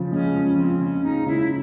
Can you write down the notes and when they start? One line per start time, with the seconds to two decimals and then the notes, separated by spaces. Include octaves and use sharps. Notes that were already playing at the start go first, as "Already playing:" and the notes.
Already playing: C#3 F3
0.12 G#3 C#4
0.36 F3
0.58 F3 C4
0.81 C#3 C#4
1.04 G#3 D#4
1.26 C#3 E4